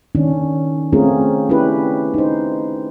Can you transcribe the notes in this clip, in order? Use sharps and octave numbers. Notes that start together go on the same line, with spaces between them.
D#3 C#4 D4
A3 C4 C#4 F4 G#4 A#4
C#4 D4 E4 G4 B4
D#4 C5